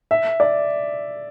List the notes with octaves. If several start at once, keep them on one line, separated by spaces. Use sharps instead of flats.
E5
D5